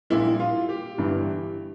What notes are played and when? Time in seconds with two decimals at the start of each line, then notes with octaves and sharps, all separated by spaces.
0.10 A#1 A#2 G3 E4
0.40 F4
0.69 G4
0.98 G1 G2 E3 G3